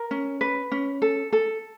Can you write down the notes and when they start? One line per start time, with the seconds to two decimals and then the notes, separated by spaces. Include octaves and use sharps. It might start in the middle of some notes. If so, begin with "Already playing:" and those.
Already playing: A#4
0.11 C#4
0.41 B4
0.72 C#4
1.02 A4
1.33 A4